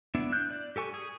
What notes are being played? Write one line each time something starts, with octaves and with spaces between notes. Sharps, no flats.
B3 D4 E4
F#6 G6
D5
G4 A4 G#5 C#6
G#4